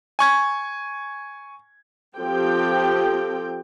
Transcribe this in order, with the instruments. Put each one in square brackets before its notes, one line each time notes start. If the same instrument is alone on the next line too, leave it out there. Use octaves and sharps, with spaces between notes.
[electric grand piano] G#5 C#6 G#6
[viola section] F3 C4 G4 A4 G5